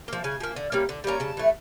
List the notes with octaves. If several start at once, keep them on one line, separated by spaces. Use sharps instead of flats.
F3 A#3
C#3 G#5
F3 A#3
D3
G3 A#3 C#4
D3
G3 A#3 C#4 A#5
C#3 A5
E3 A3